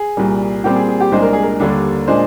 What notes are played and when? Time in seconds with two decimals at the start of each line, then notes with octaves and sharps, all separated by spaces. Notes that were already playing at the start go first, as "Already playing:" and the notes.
Already playing: G#4
0.17 C2 A#2 G3
0.64 A#2 G3 C4 G4
0.76 G#4
0.89 G#4
1.00 G4
1.12 C2 A#2 G#3 D4 C5
1.22 A#4
1.33 G#4
1.43 A#4
1.60 D#2 D3 G3 D4
2.07 A#2 G#3 D4 C5